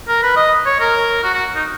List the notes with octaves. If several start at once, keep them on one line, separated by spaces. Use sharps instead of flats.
A#4
B4
D#5
C#5
A#4
F#4
F#4
D#4